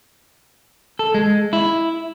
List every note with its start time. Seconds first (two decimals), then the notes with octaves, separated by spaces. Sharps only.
0.99 A4
1.14 G#3
1.53 E4